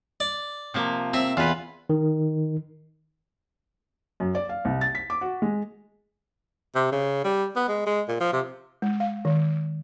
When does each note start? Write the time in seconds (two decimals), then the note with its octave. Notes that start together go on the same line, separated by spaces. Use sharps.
0.20 D5
0.74 C3 F3 A#3
1.14 C4 E5
1.37 E2 F4 B4
1.90 D#3
4.20 F#2
4.35 D5
4.49 F5
4.65 C2
4.81 A6
4.95 B6
5.10 D6
5.21 F#4
5.42 G#3
6.75 C3
6.92 C#3
7.24 G3
7.56 B3
7.68 G#3
7.87 G#3
8.08 A#2
8.20 F3
8.33 C3
8.82 G#3
9.00 F5
9.25 D#3